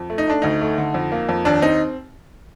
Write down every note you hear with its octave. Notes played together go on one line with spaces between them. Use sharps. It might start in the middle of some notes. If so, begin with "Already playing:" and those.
Already playing: F2
A3
D#4
A3 D4
D2 D#4
A3
D3
F2
A#3
F2
D#2 D4
C4 D#4